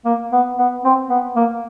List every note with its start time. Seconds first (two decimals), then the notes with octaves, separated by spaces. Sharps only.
0.05 A#3
0.32 B3
0.59 B3
0.85 C4
1.10 B3
1.36 A#3